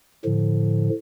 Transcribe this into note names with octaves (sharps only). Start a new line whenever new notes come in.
A2 D3 F3